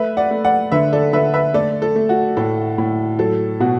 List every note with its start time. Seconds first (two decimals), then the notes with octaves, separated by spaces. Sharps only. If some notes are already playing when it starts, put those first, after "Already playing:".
Already playing: A3 B4 E5
0.17 D5 F#5
0.31 A3
0.44 D5 F#5
0.72 D3 B4 E5
0.93 A4 D5
1.13 D3 B4 E5
1.34 B4 E5
1.54 A3 A4 D5
1.82 A4
1.96 A3
2.09 F#4
2.37 A2 A4
2.78 A2
3.19 F#3 A4
3.60 B2 F#4